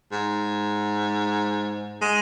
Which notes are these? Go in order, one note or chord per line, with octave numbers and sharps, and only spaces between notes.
G#2
G#3